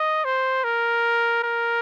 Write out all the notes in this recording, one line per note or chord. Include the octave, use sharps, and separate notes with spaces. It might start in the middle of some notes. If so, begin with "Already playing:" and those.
Already playing: D#5
C5
A#4
A#4